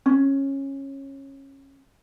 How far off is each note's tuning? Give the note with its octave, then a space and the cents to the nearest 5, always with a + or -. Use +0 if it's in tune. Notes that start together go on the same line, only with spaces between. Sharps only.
C#4 -20